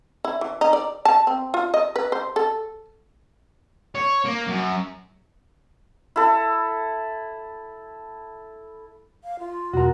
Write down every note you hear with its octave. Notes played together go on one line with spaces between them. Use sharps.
E4
E3
D#4
D5
A5
C4
F4
D#5
B4
C5
A4
C#5
A#3
F#2
E4 A4
F5
F4
E2 B2 F#4 A#4